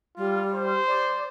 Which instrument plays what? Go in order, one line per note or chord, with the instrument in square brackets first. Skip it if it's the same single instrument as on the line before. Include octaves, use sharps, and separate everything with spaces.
[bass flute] G3 [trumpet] F4
[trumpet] C5
[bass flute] D5